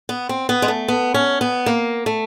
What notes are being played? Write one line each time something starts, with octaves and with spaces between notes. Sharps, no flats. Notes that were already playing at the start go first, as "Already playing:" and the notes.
B3
C4
B3
G#3
A3
B3
C#4
B3
A#3
A3